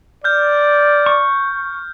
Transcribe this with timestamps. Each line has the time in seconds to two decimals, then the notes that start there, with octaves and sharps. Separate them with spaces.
0.24 D5 F6 G6
1.06 C#6